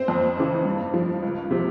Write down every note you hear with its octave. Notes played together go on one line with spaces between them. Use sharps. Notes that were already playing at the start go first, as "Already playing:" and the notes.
Already playing: C4 C5
F2
C#3 E3
G2
F3
C#2
C3 F3